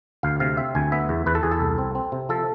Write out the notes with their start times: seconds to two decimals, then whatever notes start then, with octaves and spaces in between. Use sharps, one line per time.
0.23 D2 F5
0.40 C3 F5
0.57 C4 E5
0.75 D2 G#5
0.92 B3 E5
1.09 E2
1.26 E2 B4
1.35 A4
1.43 E2 G#4
1.51 A4
1.60 C2
1.78 C4
1.95 C4
2.12 C3
2.29 F3 A4